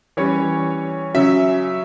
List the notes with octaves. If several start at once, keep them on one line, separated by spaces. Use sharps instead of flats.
E3 G3 C#4 C#5
C#3 F#3 C#4 E5